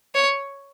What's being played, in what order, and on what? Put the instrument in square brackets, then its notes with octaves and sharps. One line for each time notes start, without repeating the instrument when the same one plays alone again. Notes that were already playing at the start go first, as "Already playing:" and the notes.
[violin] C#5